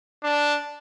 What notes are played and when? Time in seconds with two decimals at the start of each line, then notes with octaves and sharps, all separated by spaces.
0.24 D4